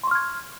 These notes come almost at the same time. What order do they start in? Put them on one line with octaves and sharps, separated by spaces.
C6 C#6 F6 G#6